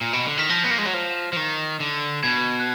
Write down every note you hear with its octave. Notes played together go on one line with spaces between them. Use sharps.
A#2
B2
D3
D#3 B6
F3 A#6
B3
A#3
G#3
F#3
F3
F3
D#3
D3
B2 G#6
F#6